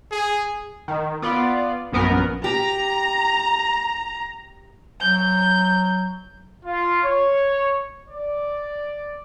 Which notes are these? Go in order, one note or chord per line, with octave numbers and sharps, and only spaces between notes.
G#4
D#3
B3 F4 D5
A#1 F#2 B3 A#4
G4 A#5
F#3 G6
F4
C#5
D5